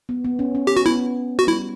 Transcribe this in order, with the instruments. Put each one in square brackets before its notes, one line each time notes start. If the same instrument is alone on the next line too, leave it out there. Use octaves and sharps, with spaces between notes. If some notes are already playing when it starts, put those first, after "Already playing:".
[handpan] B3
B3
C#4
C#4
[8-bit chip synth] G4
F#4
[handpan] B3 [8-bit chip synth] E4
[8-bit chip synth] F#4
[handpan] G3 [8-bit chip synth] E4